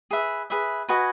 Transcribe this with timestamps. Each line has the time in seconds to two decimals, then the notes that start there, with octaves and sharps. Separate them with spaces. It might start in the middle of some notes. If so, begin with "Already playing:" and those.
0.11 G#4 B4 E5
0.50 G#4 B4 E5
0.89 F#4 B4 D#5 G#5